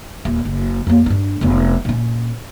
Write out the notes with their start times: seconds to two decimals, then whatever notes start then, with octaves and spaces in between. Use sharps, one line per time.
0.25 D#1
0.45 F#1
0.87 F2 A#3
1.06 G2 D4
1.41 F1 B3
1.85 A#2 C#4